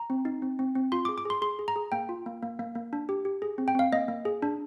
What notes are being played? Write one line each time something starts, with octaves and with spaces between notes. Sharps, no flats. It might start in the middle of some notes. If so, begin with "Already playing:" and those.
Already playing: A#5
C4
D#4
C4
C4
C4
F4 C6
G#4 D6
D6
G#4 C6
G#4 C6
G#4
A#5
G#4
A#3 G5
F4
A#3
A#3
A#3
A#3
D4
G4
G4
G#4
C4
G5
C4 F5
A#3 D#5
A#3
G#4
D4